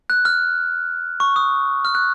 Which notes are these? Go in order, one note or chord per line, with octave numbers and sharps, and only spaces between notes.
F#6
F6
C#6
D#6
F6
F#6